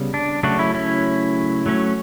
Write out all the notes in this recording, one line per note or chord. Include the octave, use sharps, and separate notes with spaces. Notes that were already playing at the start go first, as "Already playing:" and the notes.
Already playing: C#3 G3 B3
D4
C#3 F#3 A3 D4 F#4
C#4 E4
C#4 E4
F#3 A3 C#4